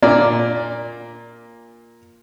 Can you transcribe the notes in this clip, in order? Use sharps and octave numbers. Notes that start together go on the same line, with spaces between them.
A#2 A#3 D5